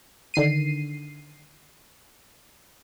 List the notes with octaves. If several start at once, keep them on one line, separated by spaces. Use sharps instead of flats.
D3 D#3 C7 D#7